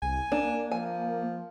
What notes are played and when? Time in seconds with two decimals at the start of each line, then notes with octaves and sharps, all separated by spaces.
0.02 C2 G#5
0.32 A#3 D4
0.72 F3 G#5